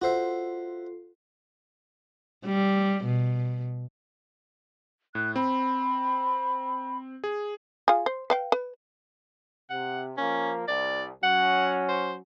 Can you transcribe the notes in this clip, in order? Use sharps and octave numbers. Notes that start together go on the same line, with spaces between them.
F4 F#4 A4 C5 E5 C7
G3
B2
A2 F#6
C4 B5
G#4
F4 G#4
C5
B4 F5 G5
B4
C3 F#5
F3 A#3 C#4
C2 D5
F#3 C#4 F#5
C5